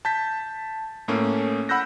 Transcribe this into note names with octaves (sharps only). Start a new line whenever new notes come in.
A5 G6 B6
A2 A3 A#3 C#4
F#5 B5 E6 F#6 G6 A#6